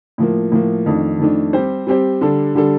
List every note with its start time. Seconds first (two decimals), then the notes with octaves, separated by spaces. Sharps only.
0.18 A2 F3 A#3
0.52 A2 F3 A#3
0.86 F2 D#3 A3 D4
1.19 F2 D#3 A3 D4
1.53 G3 C4 G4 C5
1.87 G3 C4 G4 C5
2.21 D3 G3 D4 A4
2.55 D3 G3 D4 A4